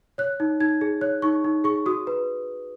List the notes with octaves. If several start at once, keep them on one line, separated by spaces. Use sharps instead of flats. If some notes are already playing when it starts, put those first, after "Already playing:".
C#5 F#6
D#4
D#4 G#6
G#4
C#5 F#6
D#4 C#6
D#4
G#4 C#6
F#4 D#6
B4